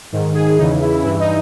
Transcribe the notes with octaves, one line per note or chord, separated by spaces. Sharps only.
G#2 D#3
G#4
E2 C#3 E3 D#4
E4
G2 E3 E4
D#4